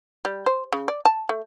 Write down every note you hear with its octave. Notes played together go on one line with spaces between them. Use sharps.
G3
C5
C#3
D5
A5
A3